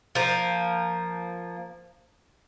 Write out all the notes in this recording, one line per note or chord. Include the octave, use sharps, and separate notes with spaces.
F3 A#3